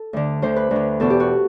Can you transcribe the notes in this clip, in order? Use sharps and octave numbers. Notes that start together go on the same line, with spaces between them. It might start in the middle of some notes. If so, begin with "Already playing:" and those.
Already playing: A4
D2 D3
D2 D3 C5
B4
D2
D3
E2 B2 A4
G4
F#4